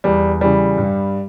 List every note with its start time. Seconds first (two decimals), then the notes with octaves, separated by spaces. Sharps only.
0.04 E2 G3
0.41 C#3 E3 G3
0.78 G2